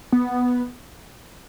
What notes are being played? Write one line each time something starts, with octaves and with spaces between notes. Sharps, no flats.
B3